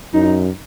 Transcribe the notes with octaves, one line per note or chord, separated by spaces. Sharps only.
F#2 D#4